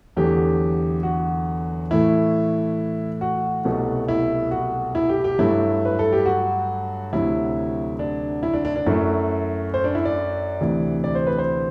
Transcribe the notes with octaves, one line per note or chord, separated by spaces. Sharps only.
E2 D3 F#3 A3 G4
F#4
A2 E3 A3 E4
F#4
C2 B2 F#3 A3
E4
F#4
E4
G4
G4
G2 F#3 A3 E4
B4
A4
G4
F#4
D2 C3 F#3 E4
D4
E4
D4
D4
D4
F#2 F#3 A3 E4
C5
D4
E4
D5
D2 C3 E3
D5
C5
B4
C5